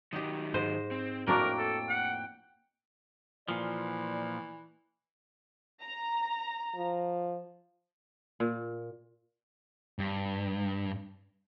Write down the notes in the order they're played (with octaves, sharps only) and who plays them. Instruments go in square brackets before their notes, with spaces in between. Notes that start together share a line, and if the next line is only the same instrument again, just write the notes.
[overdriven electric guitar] D#3 F#3 [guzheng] G4 D#5
[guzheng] G#2 [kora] C5 D#5
[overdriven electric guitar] C4
[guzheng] F2 A2 [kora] A#3 D4 F#4 [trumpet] A#4 [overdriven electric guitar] G5
[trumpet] A4
F#5
[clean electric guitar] A#2 F3 [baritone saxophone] E3 [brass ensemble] D5
[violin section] A#5
[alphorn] F3
[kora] A#2
[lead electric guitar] G2